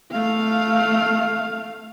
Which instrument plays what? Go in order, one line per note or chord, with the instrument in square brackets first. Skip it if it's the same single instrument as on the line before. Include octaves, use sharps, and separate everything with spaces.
[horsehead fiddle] A3 F5